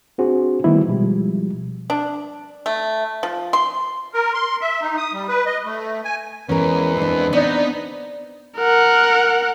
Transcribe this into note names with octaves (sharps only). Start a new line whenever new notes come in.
C4 D4 F#4 G#4 C5
D#3 G3 A3 B3 E4
B2 F3 G3 G#3
D4
A3
F3
C6
A#4
C6
E5
D#4
D#6
G3
B4
D#5
A3
G#5
E2 G#3 C#4 A#4 B4
C4 D4
B3 D#4 D5
A#4 F#5